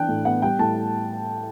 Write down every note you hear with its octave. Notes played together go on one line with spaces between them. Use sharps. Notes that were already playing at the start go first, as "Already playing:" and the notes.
Already playing: E3 D4 G5 F#6
A2
B3 F#5
G3 G5
A2 A5